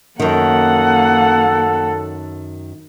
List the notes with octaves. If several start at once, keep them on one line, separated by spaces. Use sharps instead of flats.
F#2 D#3 A#3 A4 F#5